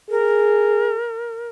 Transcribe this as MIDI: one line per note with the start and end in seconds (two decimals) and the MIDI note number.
0.10 0.97 68
0.10 1.49 70